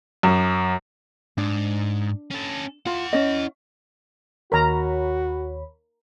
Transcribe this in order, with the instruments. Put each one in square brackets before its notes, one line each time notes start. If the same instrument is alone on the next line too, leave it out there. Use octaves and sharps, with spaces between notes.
[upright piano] F#2
[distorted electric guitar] G#2 [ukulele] D4
[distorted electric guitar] C#4 A4
[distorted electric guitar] E4 F#5 [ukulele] F4
[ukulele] C#4 D#5
[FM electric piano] D#2 C#5 B5 [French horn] F#4 [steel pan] A#4 A#5